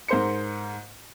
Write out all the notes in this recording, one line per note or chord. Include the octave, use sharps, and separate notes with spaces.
G#2 A#4 C5 C6 C#7